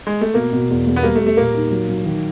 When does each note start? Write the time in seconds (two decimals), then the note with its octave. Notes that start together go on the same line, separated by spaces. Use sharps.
0.07 G#3
0.21 A3
0.34 B2 A#3
0.52 B2
0.69 E2
0.87 E2
0.96 B3
1.03 G3 A#3
1.15 A3
1.20 G3
1.26 A3
1.37 A#2 A#3
1.55 D#4
1.71 F#3
1.89 F#3
2.05 D#3